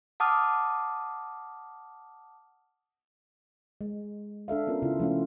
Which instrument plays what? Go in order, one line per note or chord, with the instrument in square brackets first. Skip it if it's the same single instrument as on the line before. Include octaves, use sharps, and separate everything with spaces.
[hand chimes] F#5 A5 D6 D#6 F6
[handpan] G#3
D4 A4 E5 F5
B3 C#4 F4 A#4
C#3 E4 F4
F3 A3 C#4 F4